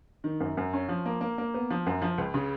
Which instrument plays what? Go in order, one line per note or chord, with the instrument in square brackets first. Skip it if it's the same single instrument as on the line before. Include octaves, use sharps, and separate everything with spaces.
[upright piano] D#3
F#2
F#2
C#4
F3
A#3
A#3
A#3
B3
F3
F#2
F3
C#2
C#3